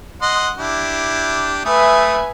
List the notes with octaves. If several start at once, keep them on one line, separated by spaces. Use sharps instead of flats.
D#5 F#5 C6
D4 E4 G4
A3 B4 E5 G#5 D#6